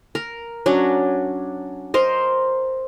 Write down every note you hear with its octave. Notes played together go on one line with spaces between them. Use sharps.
A#4
F#3 C#4 D4
A#4 C5 D#5